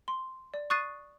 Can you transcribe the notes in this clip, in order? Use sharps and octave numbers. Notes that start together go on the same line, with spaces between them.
C6
D5
C#6 D#6 F#6 A6 C7 D#7